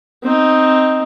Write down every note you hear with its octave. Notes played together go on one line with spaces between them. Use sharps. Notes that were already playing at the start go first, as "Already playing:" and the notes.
C4 D#4